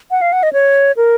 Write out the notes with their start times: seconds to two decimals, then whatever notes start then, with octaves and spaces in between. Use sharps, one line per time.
0.11 F#5
0.21 F5
0.33 F#5
0.43 D#5
0.53 C#5
0.97 A#4